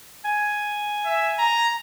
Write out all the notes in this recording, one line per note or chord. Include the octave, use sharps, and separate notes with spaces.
G#5
E5
A#5